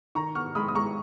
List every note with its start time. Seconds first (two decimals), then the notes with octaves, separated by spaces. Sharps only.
0.15 D#3 A#5 C#6
0.35 B3 C#6 F6
0.55 G#3 B5 D#6
0.68 D#6
0.75 G#3 A#5 C#6